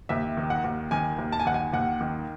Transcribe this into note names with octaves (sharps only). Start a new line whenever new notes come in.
D#2 E5
D#3
F#5
D#2
D#3 G#5
D#2
A5
G#5
D#3 F#5
G#5
D#2 F#5
D#3